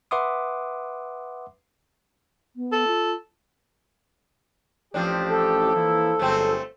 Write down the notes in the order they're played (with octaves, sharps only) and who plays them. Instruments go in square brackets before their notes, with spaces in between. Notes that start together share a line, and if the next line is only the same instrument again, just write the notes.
[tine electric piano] B4 E5 F#5 C6 D6 D#6
[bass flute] B3
[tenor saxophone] A4
[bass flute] F4
[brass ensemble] A1 G4 [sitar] F3 C4 D4
[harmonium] A4
[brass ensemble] E3 A#3 E4
[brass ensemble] G1 F#3 G#4 [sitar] A3 C4